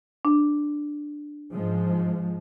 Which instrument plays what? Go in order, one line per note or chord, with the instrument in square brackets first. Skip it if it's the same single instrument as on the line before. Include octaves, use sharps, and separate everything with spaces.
[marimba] D4
[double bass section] G#2 F3 G#3